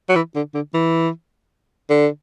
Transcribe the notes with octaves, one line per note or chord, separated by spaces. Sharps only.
F#3
E3
D3
D3
E3
D3